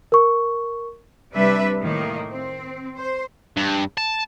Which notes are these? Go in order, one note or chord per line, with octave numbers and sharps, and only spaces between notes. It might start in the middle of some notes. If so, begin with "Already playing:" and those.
A#4 C#6
C3 G3 D4 B4 E5
A2 D#3 A#3
C4
C5
G2
A5